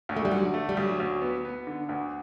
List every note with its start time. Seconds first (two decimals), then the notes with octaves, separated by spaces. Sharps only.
0.09 D2
0.17 A3
0.25 G3
0.31 D3 F#3
0.54 A3
0.69 G3
0.77 D2 F#3
1.00 D2
1.21 B3
1.45 B3
1.67 D3
1.89 D2